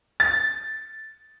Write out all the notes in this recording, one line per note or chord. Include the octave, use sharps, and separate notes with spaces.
A6